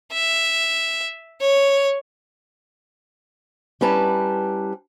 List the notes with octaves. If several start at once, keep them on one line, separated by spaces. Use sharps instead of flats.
E5
C#5
G3 C#4 E4 B4 A5 A#5